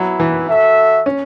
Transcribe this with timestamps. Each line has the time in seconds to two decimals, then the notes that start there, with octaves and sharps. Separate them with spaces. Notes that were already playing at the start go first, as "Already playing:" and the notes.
Already playing: F#3 B3 E4 B4
0.20 E3
0.48 F#4 A4 E5
1.06 C#4